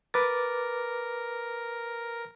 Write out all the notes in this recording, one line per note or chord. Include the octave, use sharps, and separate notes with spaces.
A#4 B4 D6 A6